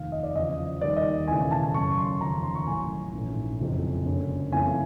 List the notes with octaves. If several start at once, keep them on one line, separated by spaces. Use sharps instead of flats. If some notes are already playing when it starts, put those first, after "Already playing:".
Already playing: F1 D#2 D#3 F5
D#5
D5
E2 C#3 F3 D#5
D#2 D#3 G3 A#3 D5
D#5
E1 D#2 C#3 E3 A3 G#5
A5
F#2 C#3 F#3 C#6
C6
F1 D#2 C#3 F3 A#5
C6
C#6
A1 A2 F#3 G#5
A#1 G#2 E3 A3 C#4
F#1 F2 C3 E3 G#3
F#1 F#2 D3
F#2 C#3 E3 A3 C4 G#5